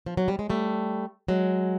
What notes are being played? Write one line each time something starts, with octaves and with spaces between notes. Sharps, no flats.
F3
F#3
G3
G#3
G3 A3
F#3 G#3